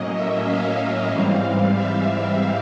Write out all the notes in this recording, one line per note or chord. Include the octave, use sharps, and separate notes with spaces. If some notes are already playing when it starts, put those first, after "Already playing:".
Already playing: A2 F#3 A#3 C#4 D#5
E5
F5
F5
G#2 E3 G3 C4
E5